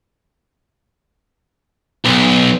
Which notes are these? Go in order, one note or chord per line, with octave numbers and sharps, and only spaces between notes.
B1